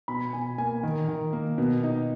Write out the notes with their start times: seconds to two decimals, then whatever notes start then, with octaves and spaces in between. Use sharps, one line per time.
0.08 B2 B5
0.33 B2 G#5
0.58 A#3 G#5
0.83 D#3
1.08 D#3
1.33 A#3
1.58 B2
1.83 D#4